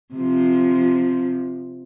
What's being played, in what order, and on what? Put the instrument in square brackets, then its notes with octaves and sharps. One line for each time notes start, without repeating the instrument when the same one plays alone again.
[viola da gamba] C3 F3